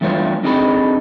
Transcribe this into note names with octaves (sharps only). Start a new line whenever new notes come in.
E2 G2 A3 F4 C#5
C4 D4 D#4 G#4 A4 B5